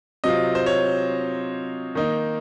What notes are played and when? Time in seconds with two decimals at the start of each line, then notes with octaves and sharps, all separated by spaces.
0.24 C3 F#3 C4 F4 D#5
0.55 C5
0.66 C#5
1.95 D#3 A#3 D#4